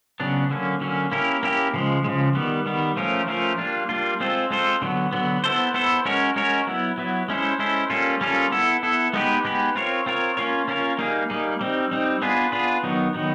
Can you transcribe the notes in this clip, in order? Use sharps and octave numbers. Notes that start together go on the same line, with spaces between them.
C#3 F#3 B3 D4
D3 F#3 A#3 C#4
D3 F#3 A#3 C#4
A#3 C#4 E4 G4 A#4
A#3 C#4 E4 G4 A#4
C#3 F3 G#3
C#3 F3 G#3
D#3 G3 B3
D#3 G3 B3
F3 A3 C#4 F4 A#4
F3 A3 C#4 F4 A#4
G3 A#3 D4 F4
G3 A#3 D4 F4
G#3 C4 F4 A4 C5
G#3 C4 F4 A4 C5
D3 F#3 B3
D3 F#3 B3
B3 E4 A4 C5
B3 E4 A4 C5
G#3 C#4 F#4 A#4 C#5
G#3 C#4 F#4 A#4 C#5
F#3 B3 E4
F#3 B3 E4
G#3 C#4 E4 A4 C5
G#3 C#4 E4 A4 C5
G3 A#3 C#4 F4 A4
G3 A#3 C#4 F4 A4
B3 E4 A4
B3 E4 A4
G#3 B3 D#4 G4 B4
G#3 B3 D#4 G4 B4
C4 F4 A#4 C#5
C4 F4 A#4 C#5
A#3 C#4 F4 A#4 C#5
A#3 C#4 F4 A#4 C#5
G3 A#3 D#4 G#4
G3 A#3 D#4 G#4
G3 C4 D#4
G3 C4 D#4
B3 D4 F4 G#4 B4
B3 D4 F4 G#4 B4
D#3 F#3 B3 D#4
D#3 F#3 B3 D#4